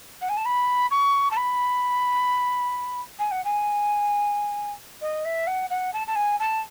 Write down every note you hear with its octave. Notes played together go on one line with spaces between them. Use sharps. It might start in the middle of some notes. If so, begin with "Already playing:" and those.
F#5
G#5
A5
B5
C#6
A5
B5
G#5
F#5
G#5
D#5
E5
F#5
F#5
A5
A5
G#5
A5